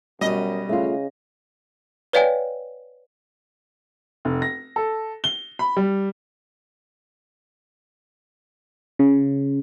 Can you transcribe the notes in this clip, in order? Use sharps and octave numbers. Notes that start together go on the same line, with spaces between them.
F#2 B2 G3 D#5
C#3 A3 F4
B4 C#5 D5 F5 G5 G#5
F1
A#6
A4
G7
B5
G3
C#3